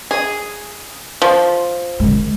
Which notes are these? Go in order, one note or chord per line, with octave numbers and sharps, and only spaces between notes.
G#4
F3
D#3 G#3